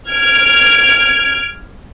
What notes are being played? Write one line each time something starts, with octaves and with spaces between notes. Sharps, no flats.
F6 G#6 D7